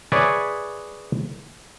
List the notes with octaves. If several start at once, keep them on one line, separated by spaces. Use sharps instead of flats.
G#4 B4 C#5 D5 E5 G#5